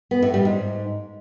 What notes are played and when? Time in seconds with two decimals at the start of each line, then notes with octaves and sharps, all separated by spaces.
0.11 B3
0.22 A2
0.34 G3
0.45 G#2